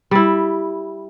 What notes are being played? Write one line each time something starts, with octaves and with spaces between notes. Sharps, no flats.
G3 E4